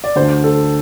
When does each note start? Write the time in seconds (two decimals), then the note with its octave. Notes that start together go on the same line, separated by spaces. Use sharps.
0.04 D5
0.16 D2 D3 C5
0.44 A4